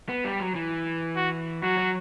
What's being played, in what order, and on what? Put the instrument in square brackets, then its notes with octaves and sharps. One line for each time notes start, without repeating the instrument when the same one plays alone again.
[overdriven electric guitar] B3
G3
F#3
E3
[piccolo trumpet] F#4
[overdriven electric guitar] F#3 [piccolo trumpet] F#4
[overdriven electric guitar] F#3